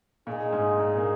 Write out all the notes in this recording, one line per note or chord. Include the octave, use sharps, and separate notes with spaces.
A#2 D#4 G#4 D#5
G#2
A#2
A#3